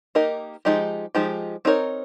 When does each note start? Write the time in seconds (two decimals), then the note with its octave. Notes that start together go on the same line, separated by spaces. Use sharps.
0.15 A#3 D#4 G4 A#4 D#5
0.65 F3 G#3 D#4 G4
1.15 F3 G#3 D#4 G4
1.65 C4 D#4 A#4 C#5